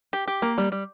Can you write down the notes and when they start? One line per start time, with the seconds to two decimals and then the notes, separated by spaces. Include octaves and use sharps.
0.13 G4
0.28 G4
0.42 A#3
0.58 G3
0.72 G3